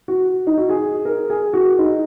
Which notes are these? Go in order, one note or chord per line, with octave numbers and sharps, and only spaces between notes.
F#4
D#4
F#4
G#4
A#4
G#4
F#4
D#4